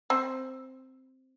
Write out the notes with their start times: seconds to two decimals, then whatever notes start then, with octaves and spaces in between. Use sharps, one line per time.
0.10 C4 C5